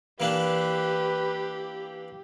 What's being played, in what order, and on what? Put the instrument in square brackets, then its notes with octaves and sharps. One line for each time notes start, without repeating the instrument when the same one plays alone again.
[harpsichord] E3 A#3 D4 [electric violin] G4 [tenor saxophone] B4